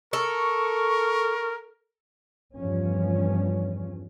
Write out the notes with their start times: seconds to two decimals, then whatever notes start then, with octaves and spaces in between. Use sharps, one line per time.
0.13 A4 A#4 C#6
2.56 E2 G2 F3 C#4